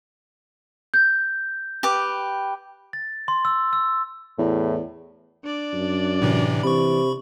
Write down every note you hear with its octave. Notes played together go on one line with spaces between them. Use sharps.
G6
G4 B4 D6
A6
C6
E6
E6
E2 A2
D4 D5
F#2
A2 C3 E3
C3 E3 B5 C#6